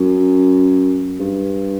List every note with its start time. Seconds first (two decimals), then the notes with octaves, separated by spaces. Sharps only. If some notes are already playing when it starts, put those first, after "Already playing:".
Already playing: F#2
1.19 G2